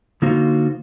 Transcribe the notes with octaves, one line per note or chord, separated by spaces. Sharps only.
D3 A#3 D#4 F4 F#4 C5